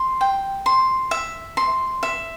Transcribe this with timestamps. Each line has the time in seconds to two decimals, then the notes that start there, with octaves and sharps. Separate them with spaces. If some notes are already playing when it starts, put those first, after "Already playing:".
Already playing: C6
0.21 G5
0.66 C6
1.11 E5
1.57 C6
2.03 E5